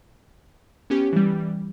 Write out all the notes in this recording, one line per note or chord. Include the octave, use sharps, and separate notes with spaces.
B3 C#4 G4
E3 G3